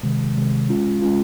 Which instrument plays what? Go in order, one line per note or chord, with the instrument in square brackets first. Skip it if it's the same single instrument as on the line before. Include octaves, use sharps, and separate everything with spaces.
[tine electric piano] C3 D#3 G#3
C3 D#3 G#3
G#3 C#4 F4
G#3 C#4 F4